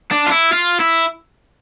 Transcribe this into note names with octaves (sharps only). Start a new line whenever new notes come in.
D4
F4
E4
F4
E4